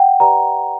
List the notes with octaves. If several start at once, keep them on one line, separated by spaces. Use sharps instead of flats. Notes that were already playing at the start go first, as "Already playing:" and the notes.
Already playing: F#5 G5
G4 B4 D5 A#5